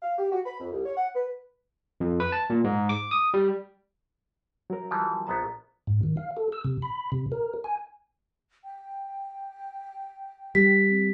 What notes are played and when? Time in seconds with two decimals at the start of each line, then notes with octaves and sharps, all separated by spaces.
0.02 F5
0.18 G4
0.32 F#4
0.46 B5
0.60 F2
0.71 C2
0.86 C#5
0.97 F#5
1.15 B4
2.00 F2
2.20 B4
2.32 A5
2.50 A#2
2.64 G#2
2.89 D6
3.11 D#6
3.34 G3
4.70 F#3 A#4
4.91 E3 F3 G3 A5
5.27 A#1 B3 A5 A#5 A6
5.87 G#2
6.03 D#3
6.17 F5
6.37 A4
6.52 E6
6.65 C3
6.82 B5
7.12 C3
7.32 A#4
7.64 G#5
8.65 G5
10.55 G3 B6
10.89 C4